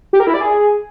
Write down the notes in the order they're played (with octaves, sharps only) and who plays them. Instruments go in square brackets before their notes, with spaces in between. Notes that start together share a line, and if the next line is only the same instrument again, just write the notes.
[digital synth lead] G4
A#4
E4
D5
G#4